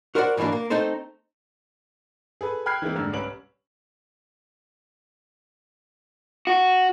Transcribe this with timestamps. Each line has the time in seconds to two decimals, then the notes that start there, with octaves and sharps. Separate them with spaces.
0.15 F#4 A#4 C5 D5 F5 F#5
0.37 G#2 E3 F#3 A#3 D4
0.52 A#3
0.70 A3 C4 D#4 A4 C5
2.41 G#4 A4 B4
2.66 G5 B5 F6 F#6 G#6 C7
2.82 E3 G#3 A#3 C4
2.96 F1 G#2 D3 E6
3.13 C2 C#4 B4 D7 F#7
6.47 F#4